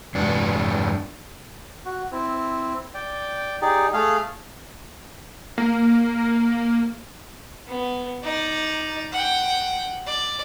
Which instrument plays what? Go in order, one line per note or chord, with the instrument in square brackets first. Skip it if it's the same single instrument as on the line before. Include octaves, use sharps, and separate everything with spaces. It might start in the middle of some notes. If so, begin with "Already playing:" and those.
[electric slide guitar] E2 G2 D4
[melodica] F#4
C4 E4
D5 G5
D#4 G4 G#4 D5
A3 G#4 F5
[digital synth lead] A#3
[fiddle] B3
D#4 D5
F#5 G5
D5